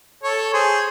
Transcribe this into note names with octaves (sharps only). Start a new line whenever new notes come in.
A4 C#5
G#4 C5